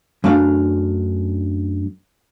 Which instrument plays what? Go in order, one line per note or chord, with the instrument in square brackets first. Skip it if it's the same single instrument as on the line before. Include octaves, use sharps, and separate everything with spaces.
[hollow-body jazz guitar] F#2 A3 D4 F5